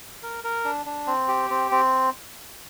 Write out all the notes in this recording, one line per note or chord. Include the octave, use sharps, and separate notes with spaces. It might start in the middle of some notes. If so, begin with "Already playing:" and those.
A#4
A#4
D4
D4
C4
G4
C4
C4